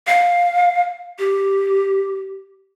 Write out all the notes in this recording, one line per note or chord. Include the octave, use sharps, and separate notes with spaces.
F5
G4